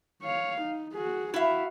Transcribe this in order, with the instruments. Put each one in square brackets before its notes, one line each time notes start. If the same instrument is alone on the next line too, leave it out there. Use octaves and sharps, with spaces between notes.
[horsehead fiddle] C#5 F5
D#4
F#4 G#4
[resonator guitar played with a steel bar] E4 E5 [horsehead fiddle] F#4 F5